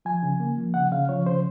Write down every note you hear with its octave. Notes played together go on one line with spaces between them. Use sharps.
F3 G#5
C#3
A#3
F3
C#3 F#5
C#3 F5
F3 C#5
C#3 C5